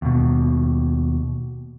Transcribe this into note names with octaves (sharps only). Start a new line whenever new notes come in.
D#2 B2